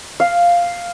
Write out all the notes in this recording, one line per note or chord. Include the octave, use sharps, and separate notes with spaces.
F5